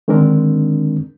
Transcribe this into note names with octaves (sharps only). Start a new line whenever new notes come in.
D3 D#3 G#3 C4 D4 A#4